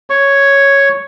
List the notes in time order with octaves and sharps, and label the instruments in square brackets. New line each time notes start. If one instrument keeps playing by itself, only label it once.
[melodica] C#5 C#6